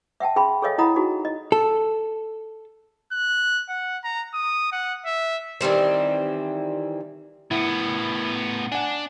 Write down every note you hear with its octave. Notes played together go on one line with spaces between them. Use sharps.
E5 F#5 G5 A5
C#4 G#4 G5 B5 C6
G#4 A4 C#5 D#5 F5 G#5
E4 D#5 F#5 A#5 B5 D#6
D#4 F#4 G#4
D#5
A4
F#6
F#5
A#5
D#6
F#5
E5
D#3 E3 G3 C4
A2 B3 E4
D4 F#5 G#5